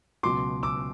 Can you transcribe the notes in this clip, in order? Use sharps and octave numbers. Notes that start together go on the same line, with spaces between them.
C#2 B2 F#3 C6 D6
D6 E6